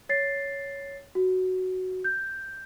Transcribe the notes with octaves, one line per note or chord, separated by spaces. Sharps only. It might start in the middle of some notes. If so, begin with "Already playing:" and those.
C#5 A6 C7
F#4
G6